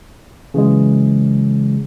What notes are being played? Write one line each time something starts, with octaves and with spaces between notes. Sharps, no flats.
C#3 E3 F#3 G#3